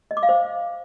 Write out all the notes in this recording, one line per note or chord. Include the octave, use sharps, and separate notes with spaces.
D#5
D6
F5
C5